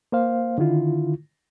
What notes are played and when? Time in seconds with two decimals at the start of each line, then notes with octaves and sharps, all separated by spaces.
0.12 A#3 C5 F5
0.58 D3 D#3 E4 F4